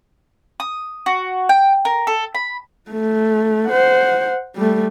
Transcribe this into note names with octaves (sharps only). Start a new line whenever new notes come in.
D#6
F#4
G5
A#4
A4
B5
A3
C5 F#5
G3 A3